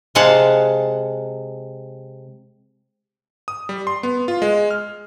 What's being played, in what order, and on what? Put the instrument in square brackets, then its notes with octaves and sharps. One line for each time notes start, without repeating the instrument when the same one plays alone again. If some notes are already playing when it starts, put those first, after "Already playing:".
[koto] C3 G#3 F5 F#5 A5
[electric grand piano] D#6
G3
C6
B3
F4
G#3
F6